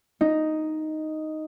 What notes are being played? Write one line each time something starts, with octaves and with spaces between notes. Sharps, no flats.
D#4